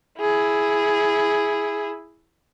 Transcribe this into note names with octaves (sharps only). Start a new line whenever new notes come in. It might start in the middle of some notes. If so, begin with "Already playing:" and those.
E4 G#4